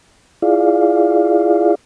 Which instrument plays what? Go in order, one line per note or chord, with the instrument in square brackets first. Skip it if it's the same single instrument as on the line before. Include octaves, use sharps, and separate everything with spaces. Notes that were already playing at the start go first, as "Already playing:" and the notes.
[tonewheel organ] E4 F4 G#4 D5 F5